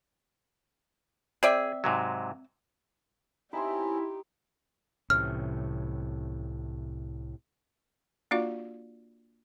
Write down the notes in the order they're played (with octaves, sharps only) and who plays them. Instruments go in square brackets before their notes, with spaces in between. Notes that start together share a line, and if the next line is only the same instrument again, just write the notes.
[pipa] C4 D5 E5 [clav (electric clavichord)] G#4
[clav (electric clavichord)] G#2 C3 F#3
[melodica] C4 C#4 [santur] D#4 A#5 C6 [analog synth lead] E4 [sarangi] G4
[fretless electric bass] C2 E3 C#4 [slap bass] A2 C3 [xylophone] F6
[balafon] A#3 D4 F4 F#4 D5 F5